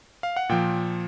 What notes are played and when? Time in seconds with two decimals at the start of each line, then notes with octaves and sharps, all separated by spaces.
0.23 F5
0.36 F#5
0.49 A#2 F3 G5